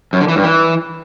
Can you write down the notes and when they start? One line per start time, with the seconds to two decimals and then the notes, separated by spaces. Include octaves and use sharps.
0.13 F#2
0.21 D3
0.28 E3
0.36 G2
0.44 E3